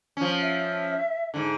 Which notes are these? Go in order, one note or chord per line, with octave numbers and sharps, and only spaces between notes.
F3 C#4
E5
G#2 D3